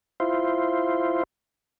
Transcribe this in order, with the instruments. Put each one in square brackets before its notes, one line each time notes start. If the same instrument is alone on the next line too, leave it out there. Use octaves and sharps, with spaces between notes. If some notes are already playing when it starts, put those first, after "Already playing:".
[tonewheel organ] E4 F4 C5